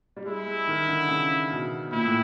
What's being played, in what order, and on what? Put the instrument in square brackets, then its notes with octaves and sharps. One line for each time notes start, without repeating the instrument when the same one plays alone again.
[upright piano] G3
[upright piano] G#3 [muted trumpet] E4
[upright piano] G#3
D#3
D3
C#3
B2
[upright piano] A#2 [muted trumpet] E4
[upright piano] A2